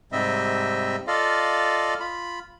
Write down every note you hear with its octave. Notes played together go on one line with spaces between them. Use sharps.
G#2 C3 G3 C4 D#5 E5
F4 A4 D5 D#5 F5
F4 B5